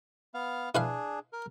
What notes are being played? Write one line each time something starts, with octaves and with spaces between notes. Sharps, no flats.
B3 F5
D4 E4 G#4 B4 F5
A#4